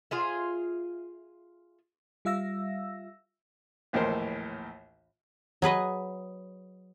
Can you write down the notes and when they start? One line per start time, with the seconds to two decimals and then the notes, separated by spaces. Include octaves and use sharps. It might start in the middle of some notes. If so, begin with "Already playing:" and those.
0.11 F4 G#4 E5
2.25 G3 F4 E5 F5 E6 A#6
3.93 A#1 D#2 A2 E3 A#4 C5
5.62 F#3 G#4 B4 D#5